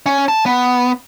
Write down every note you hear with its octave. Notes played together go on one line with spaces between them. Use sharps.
C#4
A5
B3